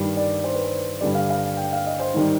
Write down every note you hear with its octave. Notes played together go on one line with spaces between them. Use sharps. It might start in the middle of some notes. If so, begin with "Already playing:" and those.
Already playing: G2 D#3 G3
D5
C5
B4
C5
G2 D3 G3 D5
F5
F5
G5
F5
D#5
C5
G#2 D#3 G3